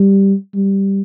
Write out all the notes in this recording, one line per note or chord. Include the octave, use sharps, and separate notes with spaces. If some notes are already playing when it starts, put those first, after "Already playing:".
Already playing: G3
G3